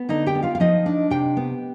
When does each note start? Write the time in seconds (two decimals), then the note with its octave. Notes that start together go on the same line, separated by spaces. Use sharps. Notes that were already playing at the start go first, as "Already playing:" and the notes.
Already playing: B3
0.09 D3 D#4 D#5
0.27 G4 G5
0.35 B3
0.43 F4 F5
0.55 F5
0.60 F3 D#4 D#5
0.86 D4
1.11 C3 G4 G5
1.37 B3